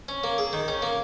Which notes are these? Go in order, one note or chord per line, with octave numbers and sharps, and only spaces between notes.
C#4
A#3
G#4
D#3
C#4
A#3